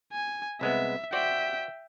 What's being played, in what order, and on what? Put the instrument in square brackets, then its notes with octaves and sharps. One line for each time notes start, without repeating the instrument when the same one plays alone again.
[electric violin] G#5
[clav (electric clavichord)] C2 G#3 B3 [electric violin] E5
[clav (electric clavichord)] F#4 C5 D5 [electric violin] E5 G5